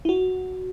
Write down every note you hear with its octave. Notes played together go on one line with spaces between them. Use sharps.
E4
F#4